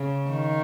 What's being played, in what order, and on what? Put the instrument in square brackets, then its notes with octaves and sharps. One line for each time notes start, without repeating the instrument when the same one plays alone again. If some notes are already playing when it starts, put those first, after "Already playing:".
Already playing: [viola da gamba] C#3
D#3